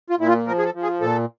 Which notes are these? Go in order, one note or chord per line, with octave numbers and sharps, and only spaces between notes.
F4
A#2 E4
F4
F3 A#4
G#4
A4
F3
G#4
A#2 A4